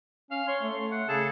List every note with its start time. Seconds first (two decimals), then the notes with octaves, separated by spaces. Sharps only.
0.31 C#4 F5 F6
0.47 C#5 C6
0.62 A3
0.91 F#5
1.08 C#3 G#4 A4 A5